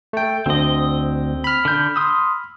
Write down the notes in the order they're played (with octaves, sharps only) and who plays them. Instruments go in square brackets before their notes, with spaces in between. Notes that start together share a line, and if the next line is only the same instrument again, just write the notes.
[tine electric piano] A3 G5
[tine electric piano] D2 [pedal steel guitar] C4 D#5
[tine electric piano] B5 F6
[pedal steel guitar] D3 G6
C6 D#6 E6